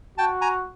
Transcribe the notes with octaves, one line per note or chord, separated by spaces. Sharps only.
F#4 G5 A5
G#5 A#5